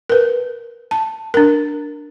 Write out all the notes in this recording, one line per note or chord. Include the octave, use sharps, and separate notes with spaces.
A#4 B4
A5
D4 A#4